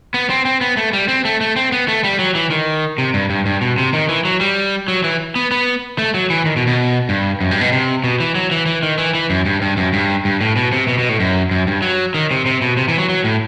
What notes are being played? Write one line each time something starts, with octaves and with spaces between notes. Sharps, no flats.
B3
C4
C4
B3
A3
G3
C4
A3
A3
C4
B3
A3
G3
F#3
E3
D#3
C3
G2
G2
G2
B2
C3
D#3
E3
F#3
G3
F#3
E3
B3
B3
A3
F#3
E3
D#3
B2
B2
G2
F#2
G2
B2
C3
B2
E3
F#3
E3
E3
D#3
E3
E3
F#2
G2
G2
F#2
G2
G2
A2
B2
C3
B2
B2
A2
F#2
F#2
G2
F#3
D#3
C3
C3
B2
C3
E3
F#3
F#3
A2